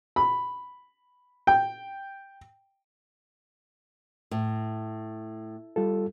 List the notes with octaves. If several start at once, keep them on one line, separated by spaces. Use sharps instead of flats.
B5
G5
A2
G3 F4 A4